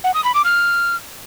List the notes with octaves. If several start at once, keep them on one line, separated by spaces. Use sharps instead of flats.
F#5
D#6
B5
D6
F6